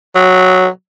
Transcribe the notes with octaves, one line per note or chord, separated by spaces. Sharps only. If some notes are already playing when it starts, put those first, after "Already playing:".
F#3